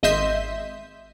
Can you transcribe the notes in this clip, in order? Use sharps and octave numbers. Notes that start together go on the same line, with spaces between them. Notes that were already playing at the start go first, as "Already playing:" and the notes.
G#1 D#5 E5 C6 G6 B6